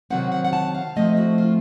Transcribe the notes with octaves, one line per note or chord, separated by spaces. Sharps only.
C3 D#3 F#3 C4 F#5
F#5
F#5
A5
F5
A2 F3 A3 C4 D#5
F#4
F4